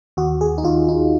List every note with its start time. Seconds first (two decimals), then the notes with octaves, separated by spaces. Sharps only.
0.17 D#2 F#4
0.41 G#4
0.58 D#4
0.64 D#2 F4
0.89 D#4